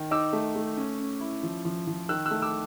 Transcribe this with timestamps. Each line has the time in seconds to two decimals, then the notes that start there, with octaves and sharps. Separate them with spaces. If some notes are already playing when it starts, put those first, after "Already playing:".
Already playing: D#3
0.11 D#4 D6 E6
0.33 A3
0.56 A3
0.77 C#4
0.99 C#4
1.21 E4
1.43 F3
1.65 F3
1.87 F3
2.09 D#3 E6 F#6
2.26 E6 F#6
2.31 A3
2.42 D6 E6